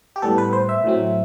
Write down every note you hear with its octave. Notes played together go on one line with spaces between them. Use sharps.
G4
A2 G3 B3 A4
B4
C5
E5
A2 F#3 C4